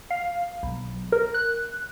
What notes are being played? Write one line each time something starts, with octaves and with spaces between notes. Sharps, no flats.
F5
B1
A#4
F#6